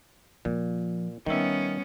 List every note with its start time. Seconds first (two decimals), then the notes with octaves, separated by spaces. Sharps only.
0.45 A#2 F3
1.26 D#3 G3 B3 C#4 E5